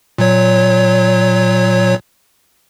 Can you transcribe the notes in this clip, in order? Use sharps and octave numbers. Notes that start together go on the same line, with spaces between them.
A#2 F#3 C#5